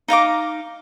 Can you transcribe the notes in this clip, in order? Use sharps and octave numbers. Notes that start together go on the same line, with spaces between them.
D#4 F5 A#5 D6